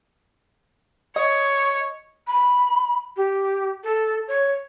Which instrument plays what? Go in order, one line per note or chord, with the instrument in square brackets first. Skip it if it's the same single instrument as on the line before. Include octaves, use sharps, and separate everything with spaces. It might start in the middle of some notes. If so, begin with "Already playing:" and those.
[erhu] C#5 [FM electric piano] D#5
[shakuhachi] B5
G4
A4
C#5